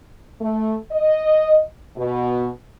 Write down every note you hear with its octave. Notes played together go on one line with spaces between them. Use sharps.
A3
D#5
B2